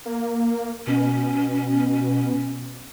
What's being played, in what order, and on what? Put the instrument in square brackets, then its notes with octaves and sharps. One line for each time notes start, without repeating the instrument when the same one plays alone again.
[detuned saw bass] A#3
[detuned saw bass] B2 [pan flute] C#4